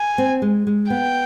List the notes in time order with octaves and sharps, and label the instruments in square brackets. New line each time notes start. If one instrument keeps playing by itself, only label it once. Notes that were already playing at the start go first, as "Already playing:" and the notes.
Already playing: [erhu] G#5
[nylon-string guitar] C4
G#3
G#3
[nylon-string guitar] B3 [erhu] G5